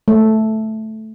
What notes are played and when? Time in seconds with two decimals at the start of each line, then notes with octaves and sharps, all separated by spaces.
0.08 A3